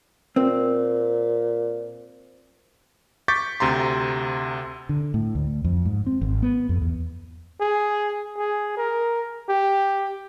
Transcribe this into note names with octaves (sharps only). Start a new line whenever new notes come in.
A#2 C4
C#6 D6 G6 A6 B6
D2 C3 A#5 C6
D3
A2
D2
F2
G#2
C4
G#1
B3
F2
E2
G#4
G#4
A#4
G4